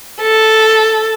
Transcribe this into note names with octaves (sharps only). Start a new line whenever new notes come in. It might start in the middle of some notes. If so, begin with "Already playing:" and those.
A4